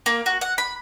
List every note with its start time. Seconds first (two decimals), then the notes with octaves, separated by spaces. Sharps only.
0.06 A#3
0.26 F#4
0.41 F#5
0.58 B5